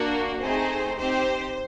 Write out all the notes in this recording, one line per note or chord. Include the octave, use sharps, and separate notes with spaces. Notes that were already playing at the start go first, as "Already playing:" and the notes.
Already playing: A#3 D4 F#4 A#4
A3 C4 D#4 G#4 C5
C4 D#4 G4 C5